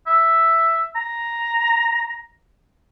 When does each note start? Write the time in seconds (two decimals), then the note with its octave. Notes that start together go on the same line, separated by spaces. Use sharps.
0.07 E5
0.96 A#5